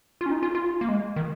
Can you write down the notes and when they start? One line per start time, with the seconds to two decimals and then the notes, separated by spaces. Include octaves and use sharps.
0.21 F4
0.26 C#4
0.31 D#4
0.43 F4
0.55 F4
0.81 A#3
0.89 G#3
1.16 D#3